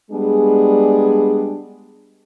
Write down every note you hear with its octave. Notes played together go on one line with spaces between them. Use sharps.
G3 G#3 B3 D4 G#4